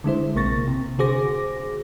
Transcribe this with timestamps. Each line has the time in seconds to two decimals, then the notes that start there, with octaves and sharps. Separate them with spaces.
0.04 D3 G#3 E4 C5
0.35 A#1 C3 A#3 C#6 A6 A#6
0.67 C3
0.99 D3 F#4 G#4 C5 D6 A#6